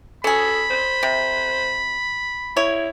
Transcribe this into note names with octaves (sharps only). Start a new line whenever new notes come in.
C#4 G#4 A4 B5
C5
C3
E4 C#5